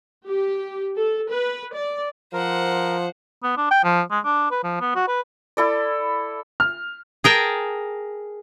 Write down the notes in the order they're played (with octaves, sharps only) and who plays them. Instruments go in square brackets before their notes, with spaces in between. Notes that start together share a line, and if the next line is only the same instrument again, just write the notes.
[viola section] G4
A4
B4
D5
[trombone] F3 [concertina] A#4 [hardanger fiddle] C5 F#5
[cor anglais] B3
D4
G5
F3
G#3
D4
B4
F3
B3
F#4
B4
[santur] E4 A4 D5
[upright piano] F6
[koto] G#4 A#4 G5 A5